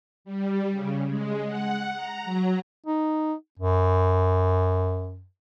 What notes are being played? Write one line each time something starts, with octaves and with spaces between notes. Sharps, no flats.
G3
C#3
G#3
F#5
A#5
F#3
D#4
F#2